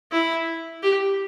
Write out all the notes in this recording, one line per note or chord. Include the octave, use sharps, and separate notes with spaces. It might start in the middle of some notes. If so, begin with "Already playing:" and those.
E4
G4